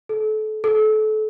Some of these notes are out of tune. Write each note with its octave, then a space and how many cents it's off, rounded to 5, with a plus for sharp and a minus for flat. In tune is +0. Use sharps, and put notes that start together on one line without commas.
A4 -30
A4 -30